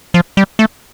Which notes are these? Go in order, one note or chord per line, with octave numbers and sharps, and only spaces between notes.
F3
G3
A3